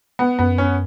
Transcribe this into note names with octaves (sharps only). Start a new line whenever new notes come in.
B3
F#2 B3
C#4